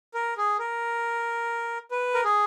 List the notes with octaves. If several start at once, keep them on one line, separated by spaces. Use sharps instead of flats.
A#4
G#4
A#4
B4
A#4
G#4